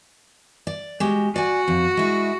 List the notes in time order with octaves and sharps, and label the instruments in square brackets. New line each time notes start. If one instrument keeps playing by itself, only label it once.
[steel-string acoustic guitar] D5
G#3 F#4 G4
[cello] F#4 [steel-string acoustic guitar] D5 G#5
[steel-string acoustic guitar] F2
G#3 E4